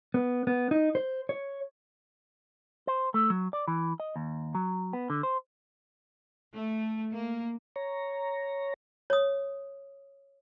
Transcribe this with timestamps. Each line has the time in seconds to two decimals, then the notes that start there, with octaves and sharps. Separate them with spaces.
0.14 B3
0.47 B3
0.71 D#4
0.95 C5
1.29 C#5
2.87 C5
3.14 A3
3.30 F#3
3.53 D5
3.68 E3
4.00 D#5
4.16 D#2
4.55 F#3
4.93 B3
5.10 D3
5.23 C5
6.53 A3
7.13 A#3
7.76 C#5 A#5
9.10 C#5 D#6